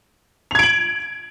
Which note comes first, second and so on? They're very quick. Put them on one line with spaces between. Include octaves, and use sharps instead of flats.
F7 G#6 D7 F#7